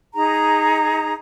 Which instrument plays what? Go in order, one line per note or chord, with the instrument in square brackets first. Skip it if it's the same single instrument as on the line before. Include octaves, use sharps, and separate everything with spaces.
[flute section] D#4 G#4 A#5